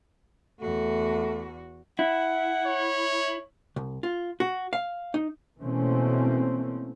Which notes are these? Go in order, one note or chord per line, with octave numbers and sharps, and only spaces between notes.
E2 A3 F#4
E4 F#5
C#5
C2
F4
F#4
F5
D#4
B2 E3 A3 A#3 C4 C#4